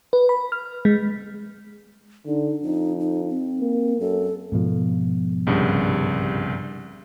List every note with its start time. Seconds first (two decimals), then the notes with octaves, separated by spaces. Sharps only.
0.13 B4
0.29 B5
0.52 F6
0.85 G#3
2.26 D3 D#4
2.63 F2 D#4
3.00 D#4
3.30 C4
3.61 A#3
4.00 F#2 A4
4.52 G#2 B2 F3
5.47 C2 G2 C#3